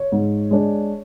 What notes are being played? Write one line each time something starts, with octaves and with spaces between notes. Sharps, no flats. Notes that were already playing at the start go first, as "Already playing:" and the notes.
Already playing: C#5
G#2
G#3 D4